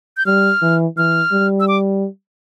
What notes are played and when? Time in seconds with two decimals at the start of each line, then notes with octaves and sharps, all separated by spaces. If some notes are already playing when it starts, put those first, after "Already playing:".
0.17 G6
0.26 G3 F6
0.62 E3
0.97 E3 F6
1.32 G3
1.60 E6
1.68 D6